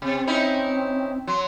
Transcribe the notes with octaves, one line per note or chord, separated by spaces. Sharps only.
C3 C4
C#4 D#4 E4
F#3 C6